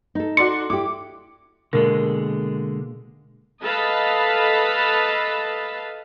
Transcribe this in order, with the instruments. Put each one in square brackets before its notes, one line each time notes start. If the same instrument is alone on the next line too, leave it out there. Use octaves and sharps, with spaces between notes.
[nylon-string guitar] D#4 A4
[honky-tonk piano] F#4 D5 C6 [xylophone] C#7
[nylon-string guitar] E4 G4 [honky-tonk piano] D6
[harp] B2 A#3 [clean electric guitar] D3 G#3 [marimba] A#4
[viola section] A4 B4 D#5 F5 A5 B5